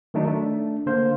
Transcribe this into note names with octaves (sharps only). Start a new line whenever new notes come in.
D#3 F#3 A3 D4 D#4
A3 D4
D3 A#3 C5 F5